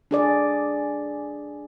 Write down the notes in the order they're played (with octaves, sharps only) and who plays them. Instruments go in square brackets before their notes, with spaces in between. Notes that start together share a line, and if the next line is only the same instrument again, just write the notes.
[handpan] D4 G#4 D5